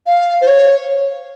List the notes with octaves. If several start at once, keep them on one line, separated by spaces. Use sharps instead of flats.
F5
C5
C#5